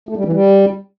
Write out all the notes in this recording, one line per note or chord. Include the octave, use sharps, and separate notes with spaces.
A3
G3
E3
G3